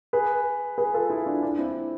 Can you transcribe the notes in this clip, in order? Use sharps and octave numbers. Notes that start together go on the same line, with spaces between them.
G#4 B4
G#4 B4
F4 A4
E4 G#4
D4 F4
D4 F4
C4 E4